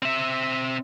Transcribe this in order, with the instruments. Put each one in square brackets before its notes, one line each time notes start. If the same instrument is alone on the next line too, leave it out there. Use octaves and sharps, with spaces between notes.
[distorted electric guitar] C4 E5